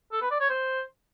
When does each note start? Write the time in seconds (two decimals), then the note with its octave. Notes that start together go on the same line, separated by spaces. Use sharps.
0.12 A4
0.21 B4
0.31 D5
0.40 C#5
0.50 C5